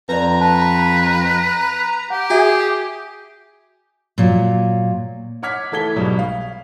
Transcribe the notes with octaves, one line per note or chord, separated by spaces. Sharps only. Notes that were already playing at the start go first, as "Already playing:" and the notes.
F2 B4 D5 A#5
B4 A5
G4 F#5
F#4 G#4 E5
A#2 F#3
C#5 F#5 D6 F6 G#6 B6
E3 A3 A4 G#6 B6 G7
B1 G#2 B2 F#3 G3
F5